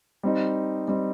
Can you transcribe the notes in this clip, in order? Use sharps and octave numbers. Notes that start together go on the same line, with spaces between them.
G3 C4 D#4
G3 C4 D#4